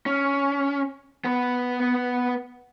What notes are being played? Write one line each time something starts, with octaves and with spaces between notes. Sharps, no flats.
C#4
B3 B4